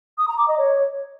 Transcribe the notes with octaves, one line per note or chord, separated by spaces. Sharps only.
D#6
A#5
D6
D#5
C#5